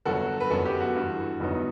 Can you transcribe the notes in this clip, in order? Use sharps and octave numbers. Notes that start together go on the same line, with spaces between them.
G1 G2 F#3 F#4 A4
B4
G1 F#2 F#3 B3 F#4 A4
G4
F#4
G2 E3 A3
G1 G2 F#3 B3 D#4